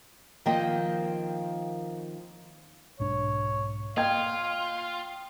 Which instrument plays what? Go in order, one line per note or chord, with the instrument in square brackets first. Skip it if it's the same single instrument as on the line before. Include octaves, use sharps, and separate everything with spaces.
[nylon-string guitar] D#3 F3 A#3 C4 D#5 G5
[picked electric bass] B1 G#2 D4 [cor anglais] C#5
[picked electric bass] A#3 [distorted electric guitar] F4 [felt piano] D#5 G5 G#6 [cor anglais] F5